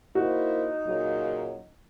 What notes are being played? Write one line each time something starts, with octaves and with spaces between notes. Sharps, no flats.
A#3 D#4 E4 F#4 C5
A#2 C#3 F#3